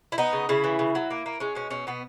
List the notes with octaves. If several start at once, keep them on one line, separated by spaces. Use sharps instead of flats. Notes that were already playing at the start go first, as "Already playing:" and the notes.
E4
B3 D#4
C#3
C#3 E4
E3
C#3
F#3
A#3
A#3
G#3 C#4
B2 C#4
B2 C#4
B2 B3